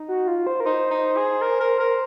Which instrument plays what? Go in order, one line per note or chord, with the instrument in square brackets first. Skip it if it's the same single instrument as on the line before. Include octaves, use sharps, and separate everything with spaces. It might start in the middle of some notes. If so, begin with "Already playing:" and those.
Already playing: [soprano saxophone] D#4
[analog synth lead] F#4
F4
C5
A#4
[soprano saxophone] D#4 [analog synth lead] C5
[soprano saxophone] D#4
G#4
A#4
A#4
A#4